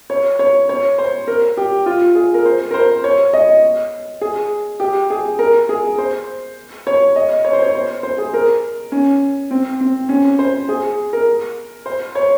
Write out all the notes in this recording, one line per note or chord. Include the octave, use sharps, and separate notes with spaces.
C#5
C#5
C#5
C5
A#4
G4
F4
G#4
A#4
C5
A#4
C5
C#5
D#5
G#4
G4
G#4
A#4
G#4
C5
C#5
D#5
C#5
C5
C#5
C5
C5
G#4
A#4
C#4
C4
C4
C#4
C5
G#4
A#4
C5
C#5